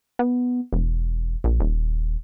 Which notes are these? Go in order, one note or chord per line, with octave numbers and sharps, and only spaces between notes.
B3
E1
A#1
D#1